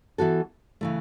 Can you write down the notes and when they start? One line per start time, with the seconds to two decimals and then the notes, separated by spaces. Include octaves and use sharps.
0.18 E3 B3 F#4 A4
0.81 C#3 E3 A3